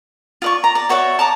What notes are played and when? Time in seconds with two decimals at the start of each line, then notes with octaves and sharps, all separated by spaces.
0.42 F4 D5 C#6
0.64 A#5
0.75 D5
0.89 F#4 C#5 D5 E5
1.19 A5 A#5 D6